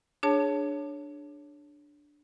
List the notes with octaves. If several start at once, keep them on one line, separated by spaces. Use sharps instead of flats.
D4 G#4 C#5 A5